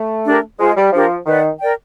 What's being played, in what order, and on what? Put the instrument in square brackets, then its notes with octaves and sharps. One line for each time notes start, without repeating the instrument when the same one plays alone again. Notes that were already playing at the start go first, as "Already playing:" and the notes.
Already playing: [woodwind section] A3
[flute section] D4 G4 A#4
[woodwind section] G#3 [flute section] F4 G#4 C5
[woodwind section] G3
[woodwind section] F3 [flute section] D4 G4 A#4
[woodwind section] D#3 [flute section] B4 D5 F#5
[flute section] A#4 D5 G5